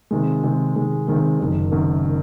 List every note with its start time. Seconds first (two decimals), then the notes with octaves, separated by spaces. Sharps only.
0.11 C3 D#3 G#3
0.43 C3 D#3 G#3
0.75 C3 D#3 G#3
1.08 C3 D#3 G#3
1.39 F#1 F#2 D#3
1.71 F#1 F#2 D#3
2.05 D#3